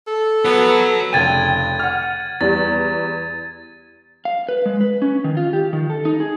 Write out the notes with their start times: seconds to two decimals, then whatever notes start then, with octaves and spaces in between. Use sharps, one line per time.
0.07 A4
0.45 B3 F#4 C#5
1.13 F1 C#3 G5 G#6 A6 D#7
1.79 F#5 F6
2.41 E2 G3 A6
4.25 F5
4.49 B4
4.66 G#3
4.81 B4
5.02 C#4
5.24 D#3
5.37 F4
5.53 G4
5.73 D#3
5.90 A4
6.05 D#4
6.20 G#4